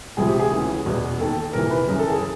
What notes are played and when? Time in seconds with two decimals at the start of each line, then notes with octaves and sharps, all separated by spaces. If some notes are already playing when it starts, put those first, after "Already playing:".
0.17 C#2 C3 F3 G#4
0.28 G4
0.40 G#4
0.51 D2 C#3 E3
0.86 E2 B2
1.20 D#2 D#3 A4
1.53 F2 C3 E3 A#4
1.70 B4
1.87 F#2 C#3 E3 A#4
1.99 A4
2.10 G#4